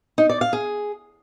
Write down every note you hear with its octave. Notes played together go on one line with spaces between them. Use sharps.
D#4
D5
F5
G#4